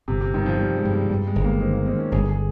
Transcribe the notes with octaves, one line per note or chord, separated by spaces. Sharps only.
G1 C3
C3
G2 D#3
F3
F3 G3
G#3
G2
G3
G2 G3
G#3
G1
A#3
D#3 C4
A#3
D#3 C4
C#4
G1 G#4
G#4